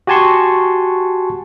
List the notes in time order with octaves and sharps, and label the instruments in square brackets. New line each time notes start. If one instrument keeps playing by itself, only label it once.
[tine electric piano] F#4 G4 G#5 A5 C6 C#6